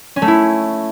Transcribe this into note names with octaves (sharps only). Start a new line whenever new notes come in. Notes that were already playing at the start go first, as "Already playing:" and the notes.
C#4
A3
E4